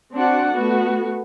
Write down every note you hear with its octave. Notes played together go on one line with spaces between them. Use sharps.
C4 D4 F#4 D5 F#5
A3 B3 F#4